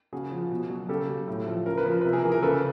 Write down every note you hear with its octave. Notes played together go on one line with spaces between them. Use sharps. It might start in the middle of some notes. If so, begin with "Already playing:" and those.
C#3 F#4 G#4
F3
B2
F#3
C#3 G4 A4
F#3
A2
F3
C#3 A#4
B4
F3 A#4
C3 B4
G#4 A#4
E3
A#4
C#3 A4 B4